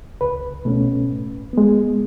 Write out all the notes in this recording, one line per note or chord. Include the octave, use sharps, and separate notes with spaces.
C#2 B4
B2 A3 C#4
A2
G#3 B3